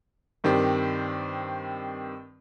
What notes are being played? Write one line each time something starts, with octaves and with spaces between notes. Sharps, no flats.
G2 D#3 C4 G4